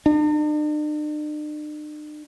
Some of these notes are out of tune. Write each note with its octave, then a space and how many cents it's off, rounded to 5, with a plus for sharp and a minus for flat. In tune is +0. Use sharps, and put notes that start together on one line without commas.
D4 +45